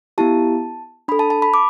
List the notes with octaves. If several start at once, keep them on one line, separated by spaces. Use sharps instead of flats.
B3 E4 G4 A5
D4 A4 B5
A5
A5
B5
D6